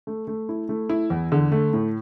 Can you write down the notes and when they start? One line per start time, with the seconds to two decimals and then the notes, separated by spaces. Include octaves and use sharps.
0.07 A3
0.27 A3
0.49 E4
0.69 A3
0.89 E4
1.10 E2
1.32 D3
1.52 A3
1.73 A2